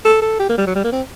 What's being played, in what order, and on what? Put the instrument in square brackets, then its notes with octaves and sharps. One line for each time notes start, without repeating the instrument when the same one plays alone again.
[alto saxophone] A4
A4
G4
A#3
G3
F#3
G3
A#3
C4